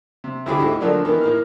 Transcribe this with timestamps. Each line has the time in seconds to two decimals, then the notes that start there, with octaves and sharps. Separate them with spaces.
0.24 C3
0.46 D2 E4 G4 G#4 B5 D6
0.58 G#2 A3 E4 F#4 G4
0.80 D3 F3 F#3 A3 A#3 D4
1.05 D#3 E3 A#3 B3
1.21 A2 A#3 F6